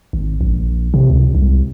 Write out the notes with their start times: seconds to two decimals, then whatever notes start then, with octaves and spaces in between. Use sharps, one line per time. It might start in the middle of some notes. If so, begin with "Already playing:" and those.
0.13 G#1
0.41 A#1
0.94 C3
1.10 C#2
1.35 C2